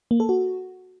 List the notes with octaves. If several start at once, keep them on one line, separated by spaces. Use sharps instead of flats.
A#3
A4
F#4